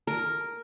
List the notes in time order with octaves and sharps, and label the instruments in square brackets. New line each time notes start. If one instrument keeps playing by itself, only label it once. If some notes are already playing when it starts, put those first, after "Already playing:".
[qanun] A#4